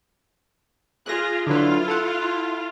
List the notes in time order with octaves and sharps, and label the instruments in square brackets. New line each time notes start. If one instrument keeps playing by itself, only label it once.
[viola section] F4 G#4 [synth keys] F#6 A#6
[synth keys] D3 F#3 B4 [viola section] E4 F4 F5
[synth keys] A4 F#5